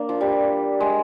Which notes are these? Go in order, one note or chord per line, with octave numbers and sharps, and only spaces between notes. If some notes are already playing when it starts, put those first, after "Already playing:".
Already playing: A#3 D4
F3
G3
G#3